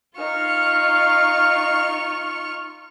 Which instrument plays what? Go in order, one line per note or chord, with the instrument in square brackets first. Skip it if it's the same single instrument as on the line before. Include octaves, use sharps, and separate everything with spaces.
[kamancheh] D#4 [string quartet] F4 C#6 F6 [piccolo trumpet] F5